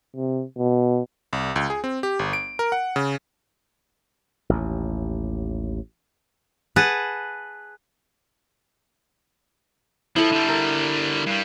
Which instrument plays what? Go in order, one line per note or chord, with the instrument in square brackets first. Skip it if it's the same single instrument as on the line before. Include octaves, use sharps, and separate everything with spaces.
[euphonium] C3
B2
[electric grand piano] C2
C#2
G#4
C4
G4
G1
D7
A#4
F#5
C#3
[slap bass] A1 D#2
[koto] G#4 B4 F#5 A5
[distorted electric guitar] F3 [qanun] E4 A4
[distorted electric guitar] D3 G3
[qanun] A#4
[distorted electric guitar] G2 G3